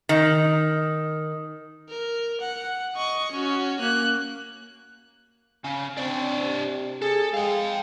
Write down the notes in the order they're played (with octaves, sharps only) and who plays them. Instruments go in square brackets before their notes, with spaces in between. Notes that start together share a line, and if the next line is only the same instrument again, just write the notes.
[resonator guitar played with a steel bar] D#3
[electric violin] A#4
F#5
D#5 C#6
C#4 F#4
A#3 F#6
[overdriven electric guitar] C#3
[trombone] C4 [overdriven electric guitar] D4 C#5
[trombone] C3
[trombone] G#4 [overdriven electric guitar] A4
[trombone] G#3 [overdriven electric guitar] F5 G5